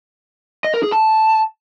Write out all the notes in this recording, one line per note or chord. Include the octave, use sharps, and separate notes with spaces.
D#5
A#4
G#4
A5